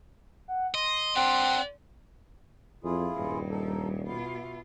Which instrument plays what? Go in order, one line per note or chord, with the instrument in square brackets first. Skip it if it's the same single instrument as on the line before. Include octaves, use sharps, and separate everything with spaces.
[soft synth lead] F#5
[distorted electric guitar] D#5 [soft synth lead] C6
[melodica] C4 F#5 [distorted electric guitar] D4 G4
[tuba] F2 [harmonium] E4 F4 G#4
[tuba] D#1 [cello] G2 G3
[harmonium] D#4 A4
[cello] B2 F4 [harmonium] E4